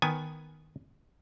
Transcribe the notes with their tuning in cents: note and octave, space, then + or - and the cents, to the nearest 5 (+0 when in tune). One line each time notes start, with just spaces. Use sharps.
D#3 +0 B3 +0 G#5 +0